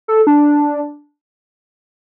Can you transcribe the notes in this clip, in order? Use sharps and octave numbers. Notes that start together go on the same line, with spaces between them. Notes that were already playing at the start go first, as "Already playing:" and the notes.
A4
D4